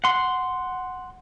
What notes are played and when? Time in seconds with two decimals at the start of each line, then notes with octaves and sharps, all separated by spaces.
0.04 F#5 C6